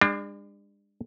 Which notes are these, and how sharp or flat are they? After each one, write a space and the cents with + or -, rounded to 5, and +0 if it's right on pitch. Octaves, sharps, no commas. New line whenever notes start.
G#3 -45 D4 +25